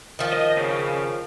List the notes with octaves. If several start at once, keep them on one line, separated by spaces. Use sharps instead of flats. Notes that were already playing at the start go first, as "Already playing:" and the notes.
D#3 F3
D#5
C#3